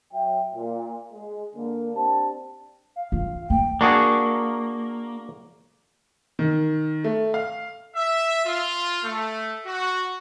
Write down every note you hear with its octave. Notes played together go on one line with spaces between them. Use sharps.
F#3 E5 G5
A#2
G#3 G#4
D3 A#3
C4 D4 G4 A5
F5
F4
A#3 G5
A#3 D4 F#4 G#4
D#3
A3
F5
E5
F4
A3
F#4